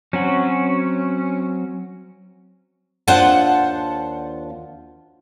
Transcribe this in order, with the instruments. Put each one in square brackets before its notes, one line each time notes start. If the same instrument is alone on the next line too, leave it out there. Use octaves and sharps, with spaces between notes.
[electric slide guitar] F#3 C4 F#4 [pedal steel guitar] C#4
[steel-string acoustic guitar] D#2 D4 F4 C5 F#5 A5